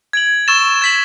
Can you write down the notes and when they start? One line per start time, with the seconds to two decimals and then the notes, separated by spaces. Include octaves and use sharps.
0.13 G#6 D7 F#7
0.48 C#6 E6 A6 E7
0.82 G#6 B6 F#7